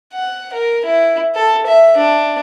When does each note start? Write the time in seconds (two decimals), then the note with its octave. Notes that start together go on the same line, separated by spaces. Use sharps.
0.13 F#5
0.53 A#4
0.85 E4
1.35 A4
1.67 E5
1.97 D4